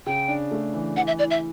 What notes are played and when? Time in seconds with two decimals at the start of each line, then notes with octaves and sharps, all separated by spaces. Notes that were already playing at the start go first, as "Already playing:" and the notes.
0.06 C#3 G5
0.28 D4
0.51 A3
0.74 E3
0.96 E3 F#5
1.07 E5
1.19 E4 D5
1.31 E5